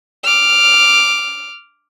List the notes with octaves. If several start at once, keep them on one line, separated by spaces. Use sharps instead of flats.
D6 F6